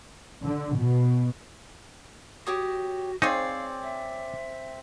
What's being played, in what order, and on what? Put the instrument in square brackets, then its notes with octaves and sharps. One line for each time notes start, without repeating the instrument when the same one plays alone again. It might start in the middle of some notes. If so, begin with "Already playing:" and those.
[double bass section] D3
B2
[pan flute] F#4 [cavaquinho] G4 C#5 D#6
[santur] C4 [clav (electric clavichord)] D#4 [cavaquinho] G#4 C#5 D5 [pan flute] F5
[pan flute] E5